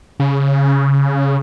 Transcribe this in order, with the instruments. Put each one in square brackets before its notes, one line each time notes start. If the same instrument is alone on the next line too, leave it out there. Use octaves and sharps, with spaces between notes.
[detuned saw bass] C#3